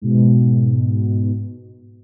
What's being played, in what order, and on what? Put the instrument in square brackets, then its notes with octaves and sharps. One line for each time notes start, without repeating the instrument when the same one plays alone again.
[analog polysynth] G#2 B2